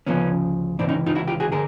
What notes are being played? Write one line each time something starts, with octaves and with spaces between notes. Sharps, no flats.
D2 C#3 F3 B3 C#4
C#2 C3 E3 C4 D4
C#4 D#4
D#4 F4
E4 F#4
F4 G4
F#4 G#4
D3 G#4 A#4